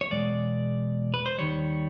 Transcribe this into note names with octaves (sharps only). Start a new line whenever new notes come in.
C#5
E2 B2 G#3 D5
B4
C5
D#2 D#3 G3 C#5